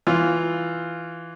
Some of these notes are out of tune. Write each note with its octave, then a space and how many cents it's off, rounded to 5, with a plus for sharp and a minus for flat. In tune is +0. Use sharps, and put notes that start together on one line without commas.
E3 +0 F4 +0